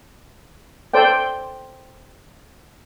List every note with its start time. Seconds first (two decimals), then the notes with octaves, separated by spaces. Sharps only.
0.94 A4 C5 D5 G5